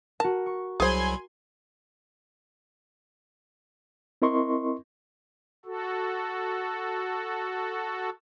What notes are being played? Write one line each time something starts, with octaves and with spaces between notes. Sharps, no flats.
F#4 A#4 A5
C#6
C2 F#3 G#4 C5 G#5 B5 C6
C4 E4 A#4 D#5 C6 C#6
F#4 A4